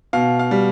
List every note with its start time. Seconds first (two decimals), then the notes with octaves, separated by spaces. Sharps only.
0.13 B2 F5
0.39 F5
0.51 G3